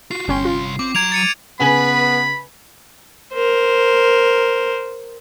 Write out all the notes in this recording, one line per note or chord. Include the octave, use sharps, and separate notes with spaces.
F4 F#4 C7
G1 C2 C#4 G5 C6
F4
C4 D6
F#3 A#5 G#6 D7 F7
A6 C#7 D#7
C#3 B3 B4 G#5 B5 F#7
A#4 C5